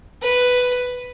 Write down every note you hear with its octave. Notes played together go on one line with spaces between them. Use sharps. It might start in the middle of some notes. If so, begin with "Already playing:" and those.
B4